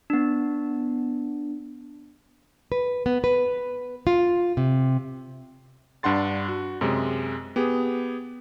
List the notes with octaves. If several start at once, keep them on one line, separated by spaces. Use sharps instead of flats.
B3 D4
B4
B3
B4
F4
C3
G2 D4 F#5 C6 A6
F#4
F#2 C3 G#3
B3 G4 G#4